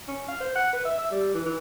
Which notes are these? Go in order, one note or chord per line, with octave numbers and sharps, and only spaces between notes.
C#4
F5
C5
F#5
B4
E5
E5
G3
E3
E3